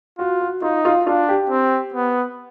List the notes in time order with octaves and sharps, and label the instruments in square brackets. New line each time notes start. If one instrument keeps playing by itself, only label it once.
[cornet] F4 [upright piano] F#4
[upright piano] F#4
[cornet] D#4 [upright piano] F4
[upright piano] F4
[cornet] D4 [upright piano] F4
[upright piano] G4
[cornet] C4
B3